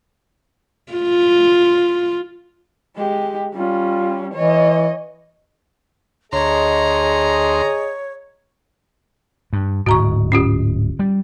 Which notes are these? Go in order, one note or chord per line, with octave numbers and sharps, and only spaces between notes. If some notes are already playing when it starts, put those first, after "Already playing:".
F4
G#3 G4
G3 C#4 F4
E3 C#5 D#5
D2 G#4 C#5 D#5 A#5 C6
G2
D1 G#2 F#4 A#5 C#6
C#4 F4 G4
G3